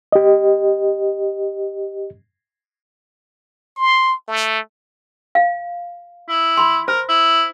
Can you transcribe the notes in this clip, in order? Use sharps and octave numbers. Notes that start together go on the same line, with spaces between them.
G4 D#5
C6
A3
F5
E4
B5 C6
A#4 C5
E4